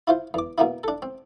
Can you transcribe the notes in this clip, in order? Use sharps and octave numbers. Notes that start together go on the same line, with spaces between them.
E4 F4 C5
E2 D6
B2 A#3 B3 E4
D4 A4
C4